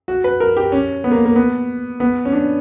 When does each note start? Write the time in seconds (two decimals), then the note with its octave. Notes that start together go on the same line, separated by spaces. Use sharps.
0.08 F#4
0.24 B4
0.40 A#4
0.57 G4
0.72 C#4
1.04 B3
1.11 A#3
1.26 A#3
1.36 B3
2.00 B3
2.25 C#4
2.32 D4